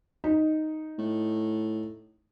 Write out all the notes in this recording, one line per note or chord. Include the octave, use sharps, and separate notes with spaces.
D#4
A2